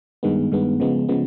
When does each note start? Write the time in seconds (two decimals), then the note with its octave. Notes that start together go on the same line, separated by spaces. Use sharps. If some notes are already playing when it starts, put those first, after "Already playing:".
0.23 G2 D#3 G#3 B3
0.52 G2 D#3 G#3 B3
0.80 C#3 F3 G#3 B3
1.09 C#3 F3 G#3 B3